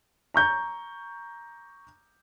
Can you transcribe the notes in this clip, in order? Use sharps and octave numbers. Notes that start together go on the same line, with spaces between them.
A#5 C#6 G6